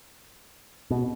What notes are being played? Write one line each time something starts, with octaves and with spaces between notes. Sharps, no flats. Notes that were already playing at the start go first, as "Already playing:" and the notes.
B2